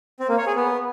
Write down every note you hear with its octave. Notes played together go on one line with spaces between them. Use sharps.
C4
A#3
C#5
G#4
B3